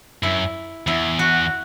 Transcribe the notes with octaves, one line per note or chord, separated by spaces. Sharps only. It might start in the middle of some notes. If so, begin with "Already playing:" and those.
F#2 E4
E2 E4
F#4